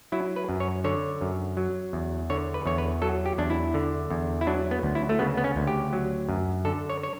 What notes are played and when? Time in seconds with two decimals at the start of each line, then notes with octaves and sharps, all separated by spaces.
0.12 F#3 E4
0.36 B4
0.49 F#2
0.60 C#5
0.84 D3 C#5
1.21 F#2
1.57 F#3
1.93 E2
2.30 D3 C#5
2.54 B4
2.66 E2 C#5
2.78 B4
3.02 F#3 A4
3.26 G4
3.38 E2 D4
3.50 E4
3.74 D3
4.10 E2
4.41 E4
4.47 F#3 D4
4.71 B3
4.83 D2
4.95 E4
5.09 A3
5.19 C#3 B3
5.37 B3
5.44 C#4
5.56 D2
5.67 G4
5.93 F#3
6.29 F#2
6.65 D3 A4
6.90 C#5
7.03 C#5